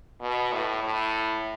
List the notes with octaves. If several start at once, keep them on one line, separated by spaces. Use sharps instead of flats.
B2
A2
A2